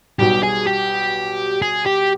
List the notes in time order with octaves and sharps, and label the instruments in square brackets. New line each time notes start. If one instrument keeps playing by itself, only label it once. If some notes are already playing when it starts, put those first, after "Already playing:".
[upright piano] B1 B2 G3 [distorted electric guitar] G4
[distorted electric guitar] G#4
G4
G#4
G4